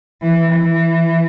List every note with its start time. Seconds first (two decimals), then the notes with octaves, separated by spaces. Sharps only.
0.22 E3
0.51 E3